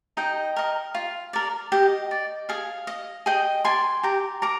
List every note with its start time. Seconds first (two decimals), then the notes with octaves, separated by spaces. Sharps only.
0.17 D#4 D#5 G5
0.56 A#4 D#5
0.95 F4
1.33 A#4 D5
1.72 G4 D#5
2.11 D5
2.49 G#4 F5
2.87 D#5
3.26 G#4 D#5 G5
3.65 D5 G#5 C6
4.03 G4 A#5 D6
4.42 A#4 A#5 D6